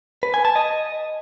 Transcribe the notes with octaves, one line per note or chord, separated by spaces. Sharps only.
B4
G#5
A5
D#5